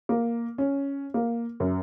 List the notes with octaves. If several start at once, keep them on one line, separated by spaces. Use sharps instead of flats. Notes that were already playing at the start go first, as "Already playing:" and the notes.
A#3
C#4
A#3
F#2